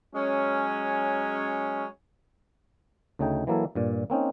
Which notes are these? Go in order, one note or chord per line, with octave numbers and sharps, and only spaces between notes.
F#3 G#3 C#4
D2 C#3 A3 D#4 G5
E3 F#3 A#3 E4 A4
G2 A#2 D5
A#3 C4 C#4 D#4